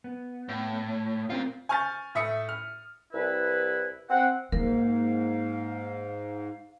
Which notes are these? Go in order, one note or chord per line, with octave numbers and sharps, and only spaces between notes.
B3
A2
C4 F4 A#4 C5 F5
G#5 C#6 F6 G6 A6
A2 E5 D#6 C#7
F6
C2 E4 B4
C4 F#5
G#2 A#3 A#4 F5